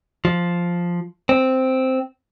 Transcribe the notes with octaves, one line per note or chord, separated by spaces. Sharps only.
F3
C4